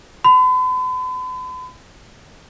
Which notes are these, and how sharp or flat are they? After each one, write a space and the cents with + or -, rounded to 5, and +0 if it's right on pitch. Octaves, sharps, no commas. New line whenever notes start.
B5 +45